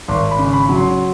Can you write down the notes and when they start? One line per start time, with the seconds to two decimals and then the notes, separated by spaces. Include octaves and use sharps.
0.08 G#1 C6
0.31 B5
0.39 C#3
0.53 B5
0.69 F#3
0.76 C6